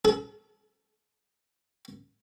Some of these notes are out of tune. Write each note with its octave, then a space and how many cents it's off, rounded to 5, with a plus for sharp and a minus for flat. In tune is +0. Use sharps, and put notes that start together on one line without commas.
A4 -40